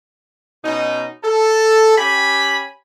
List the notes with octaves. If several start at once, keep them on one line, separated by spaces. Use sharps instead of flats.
B2 C#4 D#4
A4
C#4 G4 G#5 B5